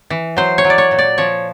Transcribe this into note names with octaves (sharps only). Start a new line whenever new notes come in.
E3
F#3 C5
C#5
F#3
D5
C#5
A#2
D5
F3 C#5